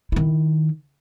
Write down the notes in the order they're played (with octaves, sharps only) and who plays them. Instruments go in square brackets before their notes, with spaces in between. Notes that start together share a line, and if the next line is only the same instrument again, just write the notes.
[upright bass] D#3 E4